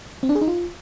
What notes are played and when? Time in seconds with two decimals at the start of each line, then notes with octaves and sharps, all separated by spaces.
0.23 C4
0.29 D4
0.35 G#4
0.41 D#4
0.48 F4